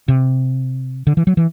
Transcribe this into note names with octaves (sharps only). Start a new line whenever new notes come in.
C3
D3
E3
F#3
E3